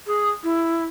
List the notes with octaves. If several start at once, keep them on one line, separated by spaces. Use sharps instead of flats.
G#4
E4